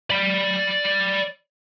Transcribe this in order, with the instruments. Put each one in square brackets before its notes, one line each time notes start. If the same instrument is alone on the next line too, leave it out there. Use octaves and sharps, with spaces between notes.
[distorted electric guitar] D5 B5